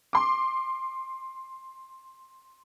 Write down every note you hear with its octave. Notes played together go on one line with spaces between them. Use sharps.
C6 D6